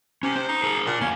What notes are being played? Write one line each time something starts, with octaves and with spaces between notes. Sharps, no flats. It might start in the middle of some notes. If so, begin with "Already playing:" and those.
C3 C#4
C5
D#4
G#4 A#4
A#2 D4
D3 A3 A#3 C#4